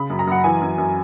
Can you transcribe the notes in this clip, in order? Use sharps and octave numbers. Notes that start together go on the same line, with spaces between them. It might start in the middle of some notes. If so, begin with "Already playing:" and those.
Already playing: C#3 B5
F#2
A#5
F#2 F#5
E3 G#5
F#2
F#2